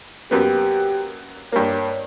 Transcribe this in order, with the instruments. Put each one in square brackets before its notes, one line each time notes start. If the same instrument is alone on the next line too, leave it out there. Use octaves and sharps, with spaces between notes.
[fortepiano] F#2 A#3 B3 [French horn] G4
[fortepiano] G2 A#3 [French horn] C#5